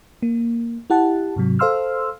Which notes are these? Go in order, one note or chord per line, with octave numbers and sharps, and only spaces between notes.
A#3
E4 G4 F#5 A5
G#2 C3 F#3
A4 C5 F5 C6 E6 F6